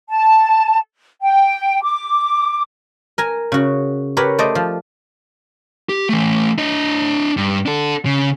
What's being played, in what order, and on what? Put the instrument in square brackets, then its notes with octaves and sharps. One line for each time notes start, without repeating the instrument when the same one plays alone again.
[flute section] A5
G5
D6
[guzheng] A#4 G#5 A#5
C#3 F#4
G4 A#4 B4 C#5 F#5
A3 C5 D5 D#5
F3
[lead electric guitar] G4
E3 A3
D4 D#5
G2
D4 A4
C#3